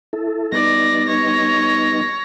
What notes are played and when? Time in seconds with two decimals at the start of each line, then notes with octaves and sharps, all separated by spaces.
0.13 E4 A4
0.52 G3 B3 D#4 D5 A#6
1.07 C#5 A#6